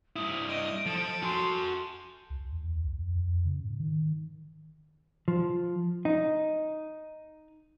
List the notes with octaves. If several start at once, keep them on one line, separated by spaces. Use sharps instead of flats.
G2 E4 D#6
D#5 D7
F3 A4
F#4 G#5 C6
C#2
E2
C#2
F2
F2
C#3
G#2
D#3
F3
D#4